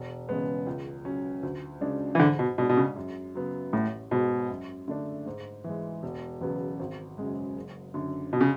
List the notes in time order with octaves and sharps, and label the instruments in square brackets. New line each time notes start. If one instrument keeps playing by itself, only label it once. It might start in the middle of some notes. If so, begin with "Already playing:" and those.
Already playing: [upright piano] E1
E2 C#3 G#3 B3
C#2
C#3 F#3 C#4
D2
C#3 G#3 D4
[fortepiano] E3
[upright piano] G#2 [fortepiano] D3
[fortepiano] B2
[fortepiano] B2 [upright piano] G#3 D4
[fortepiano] B2
C#3
[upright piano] F#2
C#3 F#3 B3
[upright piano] A1 [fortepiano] A2
[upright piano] G#2 G#3 [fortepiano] B2
[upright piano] F#2
D3 A3 D4
G#2
E3 G#3
E1
E2 C#3 F#3 B3
G#1
F#2 C#3 G#3
F#1
F#2 D3
[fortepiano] B2
C#3